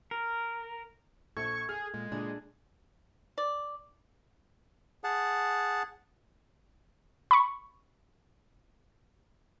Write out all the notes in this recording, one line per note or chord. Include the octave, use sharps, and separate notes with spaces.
A#4
A#1 A4 C#6 G#6
G#4 F6
A#2 G#3
A#2 D4 E4 G#4
D5
G#4 F#5 A5
B5 C#6